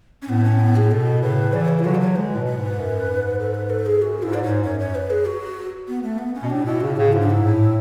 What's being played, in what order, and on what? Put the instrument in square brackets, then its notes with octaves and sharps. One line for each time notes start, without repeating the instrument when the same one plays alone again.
[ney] C#4
[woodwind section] A2 [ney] B3
[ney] C#4
B3
G#4
[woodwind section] B2 [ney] A4
[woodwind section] A2 C#3 [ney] B4
[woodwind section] C#3 E3 [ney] D5
[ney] B4
C#5
E4
[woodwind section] D3 F#3 [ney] F#4
[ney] D5
C#5
[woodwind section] E3 G#3 [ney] B4
[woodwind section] A2
B2
[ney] B4
[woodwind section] G#2
F#2
G#2
[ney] A4
B4
A4
G#4
[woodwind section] F#2 [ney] F#4
[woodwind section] G#2 [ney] E4
[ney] D5
[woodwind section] G#2 [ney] C#5
[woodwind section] F#2 [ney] C#5
[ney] C#5
B4
G#4
F#4
B3
A3
B3
C#4
[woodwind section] B2
[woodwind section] A2 [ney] D4
[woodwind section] B2 [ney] E4
[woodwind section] A2 C#3 [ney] F#4
[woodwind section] A2 C#3 [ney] G#4
[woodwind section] G#2 [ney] E4
[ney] D4
E4
[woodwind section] A2